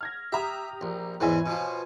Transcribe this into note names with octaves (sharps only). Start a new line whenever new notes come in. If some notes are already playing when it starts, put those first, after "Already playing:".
F6 G#6 A#6
G4 E5 A#5 D#6
A#1
E2 G#2 E3 B4 C#5 G#5
B2 F3